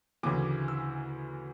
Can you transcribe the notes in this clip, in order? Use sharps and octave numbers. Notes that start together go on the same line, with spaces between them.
D2 C#3 E3 D6
E6